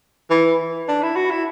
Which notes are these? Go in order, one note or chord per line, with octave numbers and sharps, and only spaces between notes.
E3
D4
E4
F#4
E4